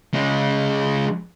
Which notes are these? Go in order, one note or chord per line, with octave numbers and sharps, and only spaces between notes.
C#3 G#3